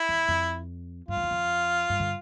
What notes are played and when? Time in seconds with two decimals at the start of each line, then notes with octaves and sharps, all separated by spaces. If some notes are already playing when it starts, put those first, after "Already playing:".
Already playing: E4
0.09 E2
0.28 F2
1.08 G2 F4
1.17 F2
1.24 E2
1.31 F2
1.89 G2
1.99 D3